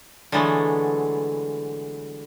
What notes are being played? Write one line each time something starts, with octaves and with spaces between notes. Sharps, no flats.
D3 E3 F#3 G#3 A3 B3